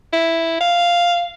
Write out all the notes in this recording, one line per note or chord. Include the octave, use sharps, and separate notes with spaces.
E4
F5